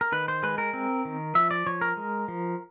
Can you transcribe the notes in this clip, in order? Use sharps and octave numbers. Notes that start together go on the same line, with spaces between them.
A#4
D#3 B4
C5
G#3 B4
A#4
C4
D#3
F3 E5
D5
F3 C#5
A#4
G#3
F3